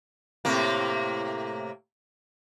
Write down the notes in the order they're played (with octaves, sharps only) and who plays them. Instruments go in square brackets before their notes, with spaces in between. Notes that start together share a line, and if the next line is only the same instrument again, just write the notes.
[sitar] A2 C3 A#3